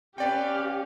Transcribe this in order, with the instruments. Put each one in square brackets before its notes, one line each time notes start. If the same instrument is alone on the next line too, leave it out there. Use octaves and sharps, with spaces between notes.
[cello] C#4 [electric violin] G4 F5 [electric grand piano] B4 D5 G5